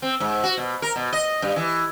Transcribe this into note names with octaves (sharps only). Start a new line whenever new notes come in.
C4
G#2
F#4
B2
A#4
B2
D#5
G2
E3